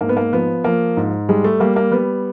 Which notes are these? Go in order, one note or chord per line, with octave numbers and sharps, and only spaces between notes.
G#2 A#3
B3
A#3
F3 B3
F3 A#3
G#2
G3 G#3
A3
G3 A#3
A#3
G3 B3